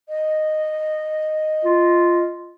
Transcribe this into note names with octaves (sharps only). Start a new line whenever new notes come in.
D#5
F4